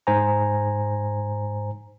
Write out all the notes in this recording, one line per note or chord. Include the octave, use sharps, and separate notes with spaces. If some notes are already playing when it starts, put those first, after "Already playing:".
G#2 C5 G#5 A#5